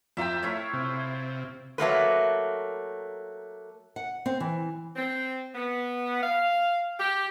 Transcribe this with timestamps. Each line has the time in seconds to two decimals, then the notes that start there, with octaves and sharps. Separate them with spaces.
0.17 F2 F4 E5 G5 A#5
0.42 A3 E4 F4 C#5
0.73 C3
1.78 F#3 A3 A#3 B4
3.96 F#5
4.26 C4
4.40 E3
4.96 C4
5.55 B3
6.22 F5
6.98 G4